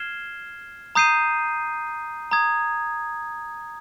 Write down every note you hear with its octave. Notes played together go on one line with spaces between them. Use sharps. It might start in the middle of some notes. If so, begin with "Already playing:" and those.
Already playing: F6 G#6 C7 E7 G7
A#5 D#6 G6 C7 D#7
A#5 D#6 G#6